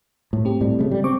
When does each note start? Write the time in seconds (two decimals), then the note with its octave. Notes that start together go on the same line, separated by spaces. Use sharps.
0.33 A2
0.45 G#2 C4 G4
0.61 A2 G3
0.79 C#3 G3 A3
0.91 G3
1.04 C4 C#6 D6